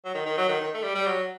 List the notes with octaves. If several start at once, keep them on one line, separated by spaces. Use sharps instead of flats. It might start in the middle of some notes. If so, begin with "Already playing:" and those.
F#3
D#3
D#3
F#3
D#3
D#3
A3
G3
G3
F#3